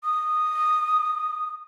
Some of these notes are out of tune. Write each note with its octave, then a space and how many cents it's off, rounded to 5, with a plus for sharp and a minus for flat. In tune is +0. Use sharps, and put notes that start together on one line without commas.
D#6 -10